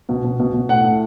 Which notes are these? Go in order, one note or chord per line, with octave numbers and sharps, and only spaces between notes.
B2
B2
B2
B2
A2 F#5
A2